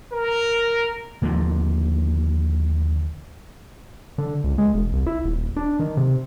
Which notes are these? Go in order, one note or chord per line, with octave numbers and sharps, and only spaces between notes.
A#4
D#2 D3 D#3 F3
D3
C#2
G#3
E1
C2
E4
D#1
D4
D#3
C3